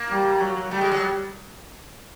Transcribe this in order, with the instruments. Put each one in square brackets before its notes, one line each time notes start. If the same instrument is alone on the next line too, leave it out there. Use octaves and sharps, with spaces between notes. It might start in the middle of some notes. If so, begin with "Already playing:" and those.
Already playing: [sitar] A#3
[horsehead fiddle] G3
F#3
[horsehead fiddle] G3 [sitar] A3
[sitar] G#3
F#3